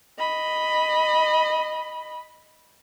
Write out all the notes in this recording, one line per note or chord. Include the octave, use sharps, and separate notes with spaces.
D#5 B5